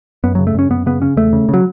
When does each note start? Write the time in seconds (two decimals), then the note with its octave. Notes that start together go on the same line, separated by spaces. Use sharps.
0.24 F#2 B3
0.35 F#3
0.39 C#3
0.47 A3
0.54 F#2 C#4
0.70 F#2 B3
0.86 C#3 B3
1.02 C#3 C#4
1.17 E2 A3
1.33 C#3
1.49 C#3 F#3